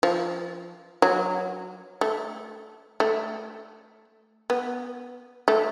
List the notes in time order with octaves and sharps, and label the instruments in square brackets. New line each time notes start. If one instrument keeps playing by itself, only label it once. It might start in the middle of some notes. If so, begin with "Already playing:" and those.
[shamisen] F3
F#3
A3
A3
B3
A3